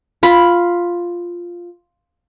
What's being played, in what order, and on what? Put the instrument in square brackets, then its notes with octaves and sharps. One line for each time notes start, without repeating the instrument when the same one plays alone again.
[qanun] F4 B5